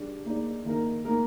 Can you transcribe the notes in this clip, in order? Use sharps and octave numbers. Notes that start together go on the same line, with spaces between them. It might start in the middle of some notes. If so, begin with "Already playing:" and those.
Already playing: G3 D4 G#4 D5
A#3 D#4 G#4 D5
D#3 A#3 D#4 A#4
A#3 D#4 A#4